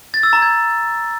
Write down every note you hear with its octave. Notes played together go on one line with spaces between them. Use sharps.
A6
E6
A#5
G#6